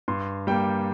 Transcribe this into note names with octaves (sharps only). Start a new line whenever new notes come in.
G2 C6
G3 A#3 G5